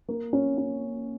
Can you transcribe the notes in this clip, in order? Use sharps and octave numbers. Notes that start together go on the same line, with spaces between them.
A#3
C#4
C#4